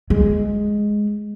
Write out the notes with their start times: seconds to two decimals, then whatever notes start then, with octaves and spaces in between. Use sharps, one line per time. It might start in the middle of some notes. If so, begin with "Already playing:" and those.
0.10 G#3